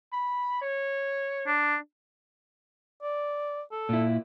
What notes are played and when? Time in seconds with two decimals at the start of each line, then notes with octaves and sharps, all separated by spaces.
0.13 B5
0.62 C#5
1.47 D4
3.02 D5
3.72 A4
3.89 A#2 E4